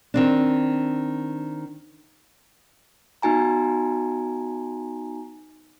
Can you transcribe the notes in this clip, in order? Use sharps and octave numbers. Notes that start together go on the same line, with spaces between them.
D#3 C4 D4
B3 D#4 F#4 G#5 A#5